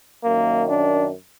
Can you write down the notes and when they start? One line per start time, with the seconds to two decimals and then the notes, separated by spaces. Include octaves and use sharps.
0.24 F#2 D#3 A#3
0.69 D4